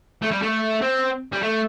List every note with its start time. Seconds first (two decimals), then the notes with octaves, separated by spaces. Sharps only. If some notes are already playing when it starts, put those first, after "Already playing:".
0.22 A3
0.31 G3
0.42 A3
0.81 C4
1.32 G3
1.42 A3